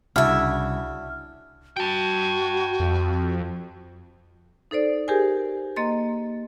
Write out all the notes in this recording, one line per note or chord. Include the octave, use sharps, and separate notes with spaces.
C2 C#3 D4 E4 F#4 E5 F6
F#4 G5 A5
F2
D#4 A4 C5 D5
G4 G#4 A#4 C5 G#5
A#3 D#5 A#5 C6 A6